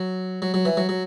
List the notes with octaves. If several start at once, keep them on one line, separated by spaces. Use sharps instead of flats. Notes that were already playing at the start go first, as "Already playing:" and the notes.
Already playing: F#3
F#3
F#3
E3
F#3
F#3